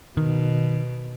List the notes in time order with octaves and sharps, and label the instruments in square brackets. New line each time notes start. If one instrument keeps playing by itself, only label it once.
[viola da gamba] B2 [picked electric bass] D#3